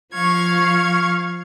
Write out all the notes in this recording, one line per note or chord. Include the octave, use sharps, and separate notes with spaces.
F3 F5 C#6 G#6